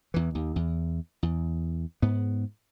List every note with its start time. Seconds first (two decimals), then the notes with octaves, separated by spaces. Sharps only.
0.14 E2 E3
0.35 D#2
0.56 E2
1.23 E2
2.02 G#2 B3